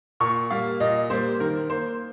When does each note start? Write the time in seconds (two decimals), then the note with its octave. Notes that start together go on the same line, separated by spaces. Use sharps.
0.20 A#2 C#6
0.50 G3 A#3 F5
0.80 A#2 D#5
1.10 G3 A#3 C5
1.40 D#3 A#4
1.70 A#3 C5